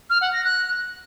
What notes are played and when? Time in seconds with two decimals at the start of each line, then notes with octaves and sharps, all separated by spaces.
0.10 F6
0.21 F#5
0.33 A#6
0.45 F#6